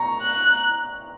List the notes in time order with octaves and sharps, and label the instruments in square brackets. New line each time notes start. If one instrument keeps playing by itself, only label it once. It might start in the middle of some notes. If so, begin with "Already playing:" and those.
Already playing: [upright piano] A#5 C#6
[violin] F#6